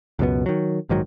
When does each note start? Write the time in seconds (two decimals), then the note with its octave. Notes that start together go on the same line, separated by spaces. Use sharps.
0.19 C#2 F#2 B2 B3
0.46 D#3 F#3
0.89 A#1 G#2 D#3 F#3